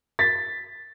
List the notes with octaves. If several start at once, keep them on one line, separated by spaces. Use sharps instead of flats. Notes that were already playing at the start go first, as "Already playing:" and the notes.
A6 B6